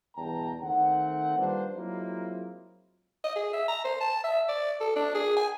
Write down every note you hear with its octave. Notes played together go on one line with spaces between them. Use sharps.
E2 G2 B2 G5 A5 A#5
D#3 A3 C4 F#5
G3 A#3 D4 F4 B4 C5
F#3 G#3 A#3 C4 E4 F4
D#5
G#4
E5
A#5
C5
A5
E5
D5
A4
D4
G#4
G#5